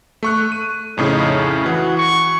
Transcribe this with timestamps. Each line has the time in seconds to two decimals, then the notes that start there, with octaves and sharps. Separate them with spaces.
0.23 A3 C#6 F#6
0.52 D#7
0.97 F2 A2 C#3 D#4
1.66 E3 F#4
1.97 C#6